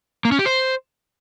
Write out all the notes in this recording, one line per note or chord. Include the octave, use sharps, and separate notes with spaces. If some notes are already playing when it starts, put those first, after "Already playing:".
A#3
C#4
G4
C5